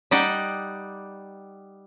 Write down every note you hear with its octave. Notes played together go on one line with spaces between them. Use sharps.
G3 D#4 D5 F#5 G5